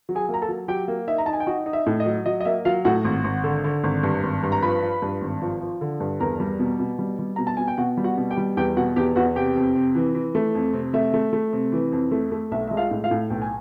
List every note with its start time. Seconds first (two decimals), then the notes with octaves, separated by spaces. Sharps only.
0.09 F#3
0.15 G#4 G#5
0.29 A#3
0.34 A#5
0.42 A4 A5
0.49 F#3
0.68 F#3 G4 G5
0.88 A#3
1.08 D#4 E5
1.18 A#5
1.26 D#4 A5
1.33 G#5
1.40 G5
1.47 D#4 F#4 F#5
1.66 D#4
1.73 E5
1.86 A2
2.00 D#5
2.06 F#3
2.26 F#3 D#5
2.41 D#5
2.45 A#3 E5
2.65 F#3 F4 F5
2.85 A2 F#4 F#5
3.05 G#1
3.24 G#1
3.44 D3
3.64 D3
3.83 G#1
4.03 G2
4.23 G#1
4.43 G2
4.52 A#5
4.62 F3 B4 B5
4.82 F3
5.02 G2
5.22 G#1
5.42 F3
5.61 F3
5.81 D3
6.00 G2
6.20 E2 A#4 A#5
6.40 G3
6.60 B2
6.80 B2
6.99 G3
7.19 G3
7.36 B2 A#5
7.47 A5
7.57 B2 G#5
7.68 G5
7.78 B2 F#4 F#5
7.97 G3
8.04 F#4 F#5
8.17 B2
8.31 G4 G5
8.37 G3
8.57 E2 G4 G5
8.77 B2 F#4 F#5
8.96 E2 G4 G5
9.16 E2 F#4 F#5
9.36 C3 G4 G5
9.56 F2
9.76 C3
9.95 E3
10.15 E3
10.35 A3
10.55 F2
10.74 C3
10.94 A3 E5
11.14 A3
11.33 A3
11.53 C3
11.72 E3
11.92 F2
12.12 A3
12.32 A3
12.52 B1 E5
12.67 G#3 E5
12.77 F4 F5
12.91 A2
13.04 F4 F5
13.11 A2
13.30 B1 G5
13.42 G#5